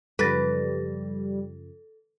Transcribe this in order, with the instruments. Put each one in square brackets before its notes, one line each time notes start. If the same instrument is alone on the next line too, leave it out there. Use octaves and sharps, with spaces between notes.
[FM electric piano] F#2 C#3 F3 [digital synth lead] G3 [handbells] A4 A6 A#6 [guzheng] B4